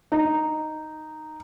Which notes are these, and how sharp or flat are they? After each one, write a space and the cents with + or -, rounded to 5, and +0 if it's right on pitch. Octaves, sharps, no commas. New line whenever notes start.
D#4 -5